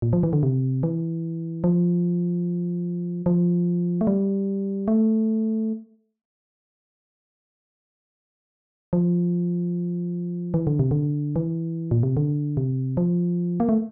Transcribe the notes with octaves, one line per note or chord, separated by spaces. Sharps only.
A#2
F3
E3
D3
C3
E3
F3
F3
A3
G3
A3
F3
E3
D3
C3
D3
E3
A#2
C3
D3
C3
F3
A#3
A3